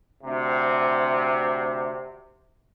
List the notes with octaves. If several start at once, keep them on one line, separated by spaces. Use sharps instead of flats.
D2 C3